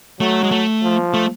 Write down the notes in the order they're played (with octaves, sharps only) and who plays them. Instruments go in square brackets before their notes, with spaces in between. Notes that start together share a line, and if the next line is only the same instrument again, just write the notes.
[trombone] F#3 [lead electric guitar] A3
[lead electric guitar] G#3
A3
[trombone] F3
[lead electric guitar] A3